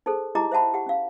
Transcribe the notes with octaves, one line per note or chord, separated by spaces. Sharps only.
D#4 G#4 A4 C5
D#4 E4 G4 D#5 A#5 D6
C5 E5 F#5 A5 B5
G4 F#5
C#4 F5